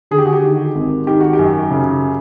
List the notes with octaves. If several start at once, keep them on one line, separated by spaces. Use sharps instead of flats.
D3 G#4
G4
F#4
G4
D#3
G#1
D#3 G4
F#4
G4
F#2
C#3